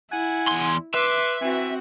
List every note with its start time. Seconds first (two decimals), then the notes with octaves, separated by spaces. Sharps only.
0.12 E4 F#5 G#5
0.48 E2 C6
0.94 B4 E5 C6 D6
1.41 E3 C4 F#4